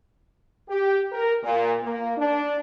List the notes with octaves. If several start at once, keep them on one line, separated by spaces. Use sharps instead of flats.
G4
A#4
A#2
A#3
D4